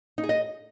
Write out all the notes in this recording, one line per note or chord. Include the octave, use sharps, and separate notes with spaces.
D#4
G#4
D#5